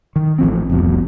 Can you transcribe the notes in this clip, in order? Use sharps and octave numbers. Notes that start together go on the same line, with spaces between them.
D#3
A1 F3 C4
F1 C2 F2 B2